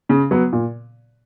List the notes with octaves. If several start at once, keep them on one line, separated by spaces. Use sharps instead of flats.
C#3
F#3 B3
A#2